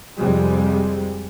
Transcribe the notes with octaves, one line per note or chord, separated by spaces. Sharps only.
F2 C3 G3 G#3